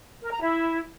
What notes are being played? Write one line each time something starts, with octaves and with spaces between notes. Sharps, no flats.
A#4
A#5
E4